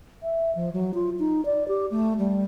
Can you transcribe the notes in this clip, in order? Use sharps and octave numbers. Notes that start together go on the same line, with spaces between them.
E5
F3
F#3
F4
D#4
D5
G4
A3
G3